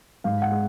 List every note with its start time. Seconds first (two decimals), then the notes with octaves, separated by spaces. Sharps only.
0.24 G#2 F5
0.42 F#5
0.51 G#3